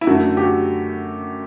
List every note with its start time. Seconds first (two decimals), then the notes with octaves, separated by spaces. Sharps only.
0.01 E4
0.07 F#2 D3 A3 F#4
0.37 G4
0.42 F#4